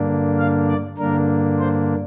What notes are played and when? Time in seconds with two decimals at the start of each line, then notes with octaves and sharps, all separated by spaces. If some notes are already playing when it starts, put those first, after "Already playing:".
Already playing: G2 D3 A#3 D4
0.38 F5
0.68 D5
0.98 G2 D3 A#3 D4 A#4
1.59 C5